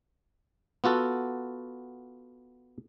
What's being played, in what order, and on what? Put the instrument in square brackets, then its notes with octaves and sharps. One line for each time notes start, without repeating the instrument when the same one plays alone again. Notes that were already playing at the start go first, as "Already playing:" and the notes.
[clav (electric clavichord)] B3 F4 F#4 A4